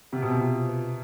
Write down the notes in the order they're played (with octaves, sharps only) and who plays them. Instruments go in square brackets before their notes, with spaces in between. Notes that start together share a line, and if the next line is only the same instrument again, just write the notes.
[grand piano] C3 [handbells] C4
[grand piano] B2
C3
[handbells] F4
B4